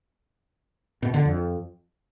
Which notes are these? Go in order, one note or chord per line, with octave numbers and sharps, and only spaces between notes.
B2
D3
F2